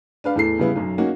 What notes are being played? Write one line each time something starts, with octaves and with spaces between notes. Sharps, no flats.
D4 B4 F5
E2 A2 A4 C7
A2 C#3 G3 B3 E4
B1 F#2
A#3 C#4 D#4 F#4